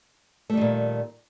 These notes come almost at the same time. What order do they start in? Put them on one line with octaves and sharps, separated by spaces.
A3 G3 D#3 A#2